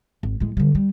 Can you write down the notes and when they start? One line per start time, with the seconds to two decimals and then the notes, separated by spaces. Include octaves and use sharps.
0.23 G#1
0.40 A2 G#3
0.57 D3 G3
0.75 G3